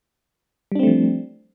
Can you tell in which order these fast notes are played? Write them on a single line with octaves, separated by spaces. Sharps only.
G3 D4 C4 A3 F3